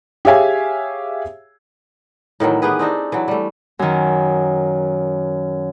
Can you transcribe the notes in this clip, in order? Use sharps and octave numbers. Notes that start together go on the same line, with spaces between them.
G4 G#4 C#5 E5 F5 G#5
A2 D#3 E3 F#3
B3 G4 G#4 B4
C4 D4 D#4 C5
E3 F#3
G3 A3
F#2 D#3